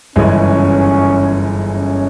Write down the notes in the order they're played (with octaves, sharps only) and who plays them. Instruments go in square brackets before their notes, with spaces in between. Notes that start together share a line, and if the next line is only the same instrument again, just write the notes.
[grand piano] G1 F#2 C#3 E3 G#3 [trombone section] C#4
[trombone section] C#4